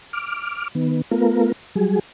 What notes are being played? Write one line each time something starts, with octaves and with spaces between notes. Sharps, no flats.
D6 F6
D#3 B3
A3 B3 F4 A#4
F#3 G3 G#4